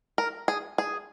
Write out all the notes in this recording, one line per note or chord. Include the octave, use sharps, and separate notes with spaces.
A#4
G#4
G#4